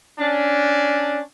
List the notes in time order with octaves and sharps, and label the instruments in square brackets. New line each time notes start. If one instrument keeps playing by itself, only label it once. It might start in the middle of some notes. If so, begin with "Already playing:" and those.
[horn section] C#4 D4